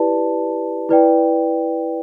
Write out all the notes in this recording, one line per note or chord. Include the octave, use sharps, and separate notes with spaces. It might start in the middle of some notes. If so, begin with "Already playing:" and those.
Already playing: E4 G4 B4 D5 A5
E4 B4 D5 G5